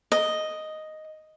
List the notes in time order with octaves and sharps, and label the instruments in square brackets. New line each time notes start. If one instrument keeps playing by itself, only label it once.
[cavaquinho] D#5